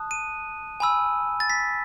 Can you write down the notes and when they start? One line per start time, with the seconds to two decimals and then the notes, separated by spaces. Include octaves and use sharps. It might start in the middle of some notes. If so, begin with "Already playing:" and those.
Already playing: A5 D#6 F#6
0.11 D#7
0.80 G#5 B5 E6
1.40 A6
1.50 B6